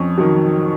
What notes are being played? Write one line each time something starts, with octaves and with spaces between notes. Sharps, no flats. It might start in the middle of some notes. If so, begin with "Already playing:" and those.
Already playing: F2 C#4
D#3 F#3